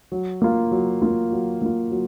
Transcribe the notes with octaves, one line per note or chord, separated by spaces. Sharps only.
F#3
A#3 F4
F#3
A#3 F4
F#3
A#3 F4
F#3